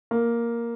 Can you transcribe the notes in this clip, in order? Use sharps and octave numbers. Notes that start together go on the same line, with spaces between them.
A#3